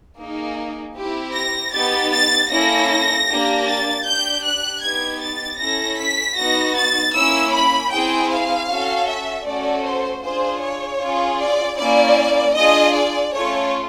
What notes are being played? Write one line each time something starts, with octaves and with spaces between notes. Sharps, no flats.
A#3 D#4 G#4
C4 E4 G4
A#6
B3 D#4 G4 A6
A6
A#3 C#4 E4 A4 A#6
A#3 D4 G4
A6
D4 G4 G6
F#6
B3 D#4 G4 G#6
A6
C#4 E4 A4 A#6
B6
B3 D#4 F#4 A#6
A6
A#3 C#4 E4 E6
B5
C4 E4 G#4 G5
F5
C#4 F#4 A4
E5
A3 C#4 F#4 A4 D5
C5
D4 F4 G#4 C5
C#5
C#4 F4 G#4
D5
A#3 C#4 E4 D5
D4 F4 G#4 D#5
D5
A3 C#4 F4 C#5